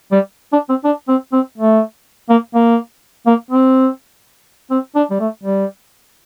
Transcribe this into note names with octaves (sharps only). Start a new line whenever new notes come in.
G3
D4
C4
D4
C4
C4
A3
A#3
A#3
A#3
C4
C4
D4
G3
A3
G3